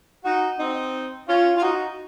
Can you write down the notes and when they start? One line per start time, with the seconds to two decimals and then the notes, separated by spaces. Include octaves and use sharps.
0.24 D#4 F#4
0.59 C4 D#4
1.28 C#4 F4
1.57 F4
1.62 D#4 F#4